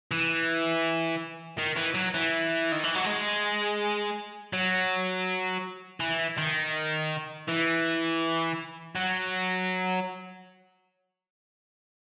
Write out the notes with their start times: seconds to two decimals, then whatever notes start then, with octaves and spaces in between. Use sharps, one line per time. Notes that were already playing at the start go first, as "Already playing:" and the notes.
0.11 E3
1.58 D#3
1.76 E3
1.95 F#3
2.14 E3
2.72 D#3
2.83 E3
2.95 F#3
3.05 G#3
4.53 F#3
6.00 E3
6.38 D#3
7.49 E3
8.96 F#3